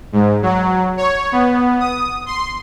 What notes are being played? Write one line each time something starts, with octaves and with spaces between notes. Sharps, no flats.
G#2
F#3
C#5
B3
D#6
C6